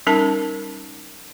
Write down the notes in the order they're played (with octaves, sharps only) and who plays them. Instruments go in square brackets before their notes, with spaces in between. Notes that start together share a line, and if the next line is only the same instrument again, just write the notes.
[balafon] G3 C#4 D#4 A#4 A5